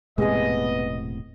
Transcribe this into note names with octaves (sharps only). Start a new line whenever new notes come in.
E1 A2 C3 G#3 B3 G#4 D#5